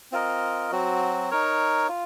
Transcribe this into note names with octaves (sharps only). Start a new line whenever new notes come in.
C4 F4 A#4 D#5
F#3 C4 F#4
D#4 A#4 C#5
F4